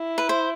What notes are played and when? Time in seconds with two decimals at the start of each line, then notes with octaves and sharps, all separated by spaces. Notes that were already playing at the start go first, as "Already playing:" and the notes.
Already playing: E4
0.18 B4
0.29 C5